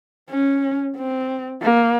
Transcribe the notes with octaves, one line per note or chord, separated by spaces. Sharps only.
C#4
C4
A#3